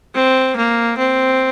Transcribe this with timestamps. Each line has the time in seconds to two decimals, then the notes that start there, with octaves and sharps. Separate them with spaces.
0.15 C4
0.56 A#3
0.98 C4